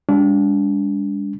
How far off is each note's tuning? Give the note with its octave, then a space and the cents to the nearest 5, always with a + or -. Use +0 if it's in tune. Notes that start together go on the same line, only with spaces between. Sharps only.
G#3 -45 D4 -35